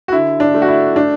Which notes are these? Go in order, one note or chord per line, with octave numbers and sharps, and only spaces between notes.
F#4
D3 E4
D4
A3
F#4
E4
A3 D4